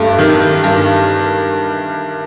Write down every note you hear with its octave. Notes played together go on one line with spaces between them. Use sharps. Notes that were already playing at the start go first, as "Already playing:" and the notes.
Already playing: G2 A3
D#3
G2